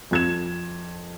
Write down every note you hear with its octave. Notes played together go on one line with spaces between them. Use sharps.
F2 G#6 E7